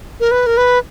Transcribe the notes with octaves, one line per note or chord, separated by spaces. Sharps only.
A#4
B4
A#4
B4